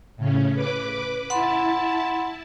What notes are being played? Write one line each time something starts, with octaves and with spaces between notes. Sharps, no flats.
A2 C#3 C#4
B4 D6
E4 F#5 A5 B5 C6